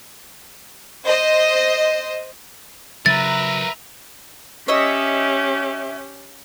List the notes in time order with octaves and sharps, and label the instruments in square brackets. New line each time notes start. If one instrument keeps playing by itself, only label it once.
[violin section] C5 D#5
[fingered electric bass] C#3 F#3 C#4 [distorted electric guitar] A#4 B4 [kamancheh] E5 A#5 [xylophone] A6
[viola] C#4 G4 [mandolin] C#5 D#5 E5